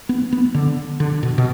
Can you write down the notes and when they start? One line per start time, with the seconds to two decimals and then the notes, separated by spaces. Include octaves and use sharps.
0.09 B3
0.32 B3
0.54 D3
1.00 D3
1.23 B2
1.38 B2